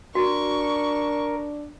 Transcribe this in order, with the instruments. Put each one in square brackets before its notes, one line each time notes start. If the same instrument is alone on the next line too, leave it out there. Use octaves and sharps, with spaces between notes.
[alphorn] D4 [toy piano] F#4 [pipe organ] A#4 [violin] C#6